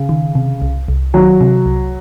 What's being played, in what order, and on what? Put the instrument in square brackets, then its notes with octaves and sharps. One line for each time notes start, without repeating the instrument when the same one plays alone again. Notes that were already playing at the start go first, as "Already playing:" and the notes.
Already playing: [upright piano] C#3
[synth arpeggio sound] D#3
C3
C2
C2
[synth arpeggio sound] D#3 [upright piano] F#3
[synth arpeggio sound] C3
C2